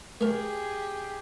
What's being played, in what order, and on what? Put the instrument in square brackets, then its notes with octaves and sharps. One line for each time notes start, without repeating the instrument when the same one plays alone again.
[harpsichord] A3 A#4 [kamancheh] G4 G#4